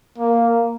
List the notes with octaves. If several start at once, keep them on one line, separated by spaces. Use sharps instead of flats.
A#3